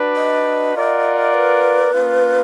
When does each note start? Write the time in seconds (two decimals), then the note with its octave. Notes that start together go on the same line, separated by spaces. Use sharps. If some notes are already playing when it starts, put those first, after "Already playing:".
Already playing: D4 F#4 B4 D5
0.16 D#5
0.75 F4 A#4 D5 F#5
1.34 B4
1.93 A#3 C#4 F4